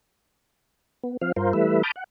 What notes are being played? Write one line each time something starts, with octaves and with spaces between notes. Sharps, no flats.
B3
F3 C4 F5
G2 F4 A#4 C5
E3 G3 A3 B4 E5
A5 B5 D6 D#6 F6 G6
F#5